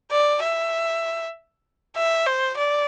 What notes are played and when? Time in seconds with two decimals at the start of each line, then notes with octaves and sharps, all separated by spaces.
0.11 D5
0.43 E5
1.96 E5
2.26 C5
2.57 D5